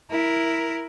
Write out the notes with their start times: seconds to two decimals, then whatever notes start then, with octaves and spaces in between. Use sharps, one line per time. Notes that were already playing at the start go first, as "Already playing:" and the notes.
0.11 E4 A#4